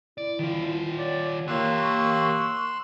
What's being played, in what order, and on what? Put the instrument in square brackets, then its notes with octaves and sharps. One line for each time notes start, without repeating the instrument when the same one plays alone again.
[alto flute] E4 [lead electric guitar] D5
[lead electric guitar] D#3 F4
[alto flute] C#5 [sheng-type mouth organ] D5
[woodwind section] A#3 [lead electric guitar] G4 C#5 [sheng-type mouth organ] C6 E6 F#6 [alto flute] C#6